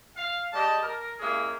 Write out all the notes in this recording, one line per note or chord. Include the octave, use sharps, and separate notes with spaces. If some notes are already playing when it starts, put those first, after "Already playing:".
F5
G#3 G4 B4 D5 D#5 A5
A#4
G#3 A#3 C#4 E4 G4 G#4